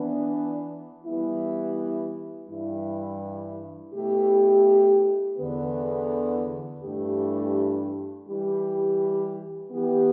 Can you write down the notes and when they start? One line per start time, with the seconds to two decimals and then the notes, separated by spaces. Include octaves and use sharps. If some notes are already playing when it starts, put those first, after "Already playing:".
Already playing: E3 B3 D4
1.05 E3 G3 B3 E4
2.49 G2 E3 G3 E4
3.94 B2 A3 E4 G4
5.38 E2 D3 B3
6.83 G2 E3 A3 D4 G4
8.28 E3 G3 E4 G4
9.72 E3 B3 G4